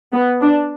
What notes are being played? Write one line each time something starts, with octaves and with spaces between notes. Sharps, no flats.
B3
D4